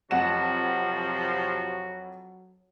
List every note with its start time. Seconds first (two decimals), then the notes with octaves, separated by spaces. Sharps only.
0.11 F2 C3 F3 F#3 F#4 F#5 E7